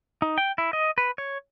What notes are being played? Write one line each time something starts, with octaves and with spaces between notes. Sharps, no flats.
D#4
G5
E4
D#5
B4
C#5